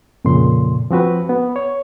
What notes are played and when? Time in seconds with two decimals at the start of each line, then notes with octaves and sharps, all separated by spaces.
0.25 F2 A#2 C#3 C6
0.91 F3 C4 F#4 B4
1.29 B3
1.56 C#5